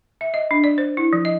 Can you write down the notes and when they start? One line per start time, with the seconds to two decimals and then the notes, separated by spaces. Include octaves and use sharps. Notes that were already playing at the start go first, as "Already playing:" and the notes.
0.21 E5
0.34 D#5
0.51 D4
0.64 D5
0.78 C5
0.97 E4
1.13 F3
1.25 D#5